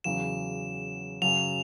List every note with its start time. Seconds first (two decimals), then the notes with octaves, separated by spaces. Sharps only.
0.04 E2 C#3 F#3 E7
1.22 F#2 C#3 F#3 F7